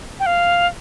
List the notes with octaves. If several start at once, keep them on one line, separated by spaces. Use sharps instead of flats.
G5
F5